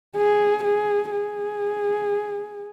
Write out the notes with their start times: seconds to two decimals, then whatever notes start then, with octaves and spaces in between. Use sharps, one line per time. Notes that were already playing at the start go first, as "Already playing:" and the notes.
0.17 G#4
0.64 G#4
1.11 G#4